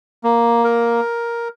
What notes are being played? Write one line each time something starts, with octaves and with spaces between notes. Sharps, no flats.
A#3
A#4